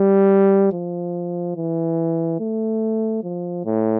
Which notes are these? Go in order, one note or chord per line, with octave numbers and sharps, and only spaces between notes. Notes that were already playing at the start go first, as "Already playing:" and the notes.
Already playing: G3
F3
E3
A3
F3
A2